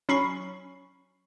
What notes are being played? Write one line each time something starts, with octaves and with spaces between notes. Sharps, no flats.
F#3 C#4 B5 C#6 C7